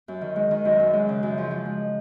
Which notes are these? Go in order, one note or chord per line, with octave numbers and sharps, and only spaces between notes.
F#2
D#3
G#3
D#3
F#2
F#2
G#3
C#3
F#2
F3
F3
G#3